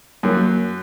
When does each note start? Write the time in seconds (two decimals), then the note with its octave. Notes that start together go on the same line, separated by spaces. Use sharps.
0.23 F#2 F#3 A#3